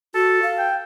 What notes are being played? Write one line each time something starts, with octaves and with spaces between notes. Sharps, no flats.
F#4 A4
F5
G5